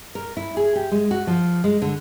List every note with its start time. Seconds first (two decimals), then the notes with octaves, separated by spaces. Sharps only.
0.15 A#4
0.37 E4
0.57 G#4
0.76 G4
0.92 G#3
1.11 F#4
1.27 F3
1.64 G#3
1.82 D3